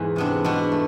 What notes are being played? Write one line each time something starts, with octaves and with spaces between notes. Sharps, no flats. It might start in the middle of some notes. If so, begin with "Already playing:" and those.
Already playing: E2 G#2 E3
C3 B3 D4
B2 B3 D4
A3